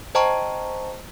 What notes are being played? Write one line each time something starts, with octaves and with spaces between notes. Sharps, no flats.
C5 D#5 G5 A5 A#5 C#6